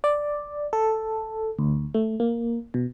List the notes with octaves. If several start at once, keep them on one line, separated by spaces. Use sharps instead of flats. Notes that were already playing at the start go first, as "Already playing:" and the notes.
D5
A4
D2
A3
A#3
B2